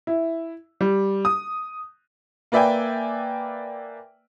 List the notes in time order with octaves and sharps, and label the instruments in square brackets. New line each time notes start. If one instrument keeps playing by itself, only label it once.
[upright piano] E4
G3
D#6
A#3 B4 D5 E5 G5 G#5